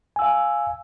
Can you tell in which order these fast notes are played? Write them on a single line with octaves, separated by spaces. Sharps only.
G#5 E6 F5